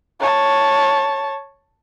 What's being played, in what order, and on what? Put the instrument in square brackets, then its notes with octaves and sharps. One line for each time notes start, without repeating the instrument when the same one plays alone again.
[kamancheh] C#5 A5